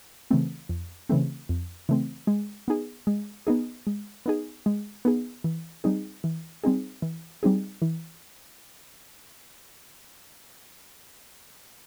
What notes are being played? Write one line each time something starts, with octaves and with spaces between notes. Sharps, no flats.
C#3 E3 A3 C4
F2
C#3 E3 A3 C4
F2
C#3 E3 A3 C4
G#3
B3 D#4 G#4
G#3
B3 D#4 G#4
G#3
B3 D#4 G#4
G#3
B3 D#4 G#4
E3
G3 C4 D#4 G#4
E3
G3 C4 D#4 G#4
E3
G3 C4 D#4 G#4
E3